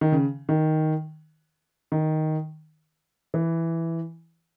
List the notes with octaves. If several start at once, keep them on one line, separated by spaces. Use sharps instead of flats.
D#3
C#3
D#3
D#3
E3